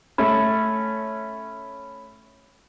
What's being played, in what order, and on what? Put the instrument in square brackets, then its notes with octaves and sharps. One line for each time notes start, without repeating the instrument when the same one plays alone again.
[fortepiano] A3 C#4 [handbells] B5